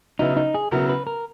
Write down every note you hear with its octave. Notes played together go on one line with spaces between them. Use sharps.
C#3 F#3 B3 D#4 E4
D#4
G#4
C#3 F#3 B3 E4 A#4
B4
A#4